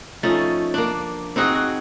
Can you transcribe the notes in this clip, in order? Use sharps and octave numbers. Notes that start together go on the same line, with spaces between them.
F3 A3 C#4 D#4
A#3 D4
C4 D#4 F#4 G#4
F#4